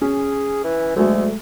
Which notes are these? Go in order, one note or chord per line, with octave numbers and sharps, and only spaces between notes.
C#4 G#4
E3
D2 F#3 G#3 A3